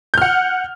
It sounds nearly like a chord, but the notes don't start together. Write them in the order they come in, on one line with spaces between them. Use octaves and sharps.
G6 F6 F#5